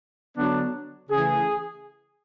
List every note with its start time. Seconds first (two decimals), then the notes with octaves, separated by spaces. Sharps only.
0.36 D3 F#3 B3 D4
1.10 C#3 E3 A3 G#4